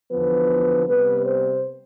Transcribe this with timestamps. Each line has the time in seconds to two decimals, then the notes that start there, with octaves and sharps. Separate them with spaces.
0.11 E2 D3 F3 B3 B4
0.86 C3 G3 B3 B4
1.24 C5